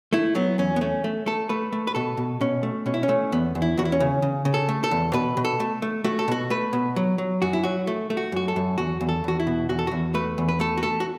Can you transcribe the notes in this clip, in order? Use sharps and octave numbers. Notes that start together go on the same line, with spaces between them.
A3 E4
F#3 B3
E2 C#4
B3
A3 C#4
A3
A3 A4
A3 B4
A3
B4
B2 A4
B2
B2 C#4
A3
B2 C#4
E4
C#4
A3
E2 B3
E2
E4
E2 F#4
E4
C#4
C#3
C#3
C#3
A4
A3
A4
E2
B2 B4
B2
A4
A3
A3
A3 F#4
A4
B2 F#4
A3 B4
B2
F#3
F#3
F#2 F#4
E4
F#3 F#4
A3
A3
F#4
F#2 F#4
A4
F#2
E2 F#4
E2
A4
E2 F#4
E4
B2
E2 F#4
A4
E2 F#4
A3 B4
E2
B4
A3 A4
F#4
A3 A4
F#4